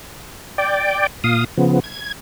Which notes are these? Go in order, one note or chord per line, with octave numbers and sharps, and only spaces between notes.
D5 G5
A#2 F5 D#6
C#3 F3 B3
G#6